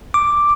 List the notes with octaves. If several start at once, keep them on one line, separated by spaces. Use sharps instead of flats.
D6